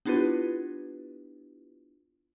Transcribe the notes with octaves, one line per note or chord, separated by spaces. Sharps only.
B3 D4 E4 F4 G4 B4